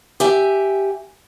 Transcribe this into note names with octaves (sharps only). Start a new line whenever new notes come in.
G4 E5 G#5